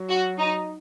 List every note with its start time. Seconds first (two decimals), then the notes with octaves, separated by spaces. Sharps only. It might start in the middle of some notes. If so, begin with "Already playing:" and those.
Already playing: F#3
0.09 F#4
0.38 D#4